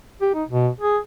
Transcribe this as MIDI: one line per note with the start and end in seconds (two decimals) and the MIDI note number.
0.21 0.30 67
0.34 0.43 63
0.49 0.69 47
0.81 0.98 68